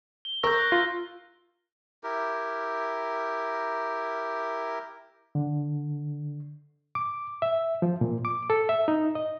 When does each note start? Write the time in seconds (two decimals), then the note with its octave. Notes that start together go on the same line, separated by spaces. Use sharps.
0.25 G7
0.43 A#4 C#6 E6 G6 A#6
0.59 F#6
0.72 F4
2.04 E4 G4 A#4
5.35 D3
6.95 D6
7.42 E5
7.82 F3
8.01 A#2
8.25 D6
8.50 A4
8.69 E5
8.88 D#4
9.15 D#5